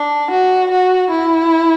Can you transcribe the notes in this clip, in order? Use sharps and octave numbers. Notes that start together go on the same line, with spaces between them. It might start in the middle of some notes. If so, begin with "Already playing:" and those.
Already playing: D4
F#4
F#4
E4